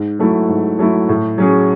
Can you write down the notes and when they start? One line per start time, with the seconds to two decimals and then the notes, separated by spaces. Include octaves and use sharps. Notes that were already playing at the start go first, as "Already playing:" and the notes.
Already playing: G#2
0.19 F#3 A3 E4
0.49 G#2
0.79 F#3 A3 E4
1.09 A2
1.38 F#3 C#4 G#4